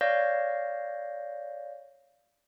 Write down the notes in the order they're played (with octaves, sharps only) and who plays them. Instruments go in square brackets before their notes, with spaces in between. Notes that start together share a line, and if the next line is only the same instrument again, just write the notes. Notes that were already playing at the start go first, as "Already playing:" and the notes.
[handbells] C#5 D5 F5 G6 A#6